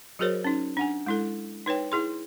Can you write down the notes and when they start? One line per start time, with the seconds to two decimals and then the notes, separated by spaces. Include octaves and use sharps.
0.19 F#3 F#4 G#4 A#4 C5 C#5
0.44 C#4 D#4
0.77 D4 F#5 G#5
1.06 G#3 E4 A4
1.66 D#4 B4 C#5 G5
1.92 E4 G#4 C6